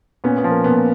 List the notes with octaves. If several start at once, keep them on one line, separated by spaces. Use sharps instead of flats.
A#2 B3 C#4
B3
F3
A#3
A#2 B3